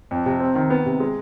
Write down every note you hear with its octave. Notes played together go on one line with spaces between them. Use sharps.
F2
C3
C4
D#3
B3
C3
G#3